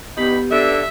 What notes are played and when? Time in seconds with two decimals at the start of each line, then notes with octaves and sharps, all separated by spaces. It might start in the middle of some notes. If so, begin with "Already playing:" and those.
0.17 G2 B3 D#4 G4 B5
0.52 D3 E5